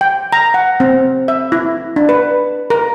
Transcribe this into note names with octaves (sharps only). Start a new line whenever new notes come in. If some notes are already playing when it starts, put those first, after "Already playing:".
G5
A#5
F#5
C4
E5
E4
D4
B4
A#4